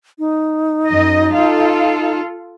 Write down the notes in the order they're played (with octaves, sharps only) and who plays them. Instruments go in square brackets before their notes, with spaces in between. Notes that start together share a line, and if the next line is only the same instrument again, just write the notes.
[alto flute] D#4
[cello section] F#2 D#5
F4 A4 F5